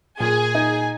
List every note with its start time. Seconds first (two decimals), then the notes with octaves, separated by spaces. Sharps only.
0.19 A#2 G#4 G#5
0.55 D#4